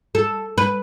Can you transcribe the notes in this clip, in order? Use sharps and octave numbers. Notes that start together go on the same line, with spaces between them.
A4
B4